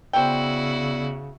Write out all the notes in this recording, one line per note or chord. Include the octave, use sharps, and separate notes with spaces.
C#3 B3 E4 F#4 C5 D5 G5 E6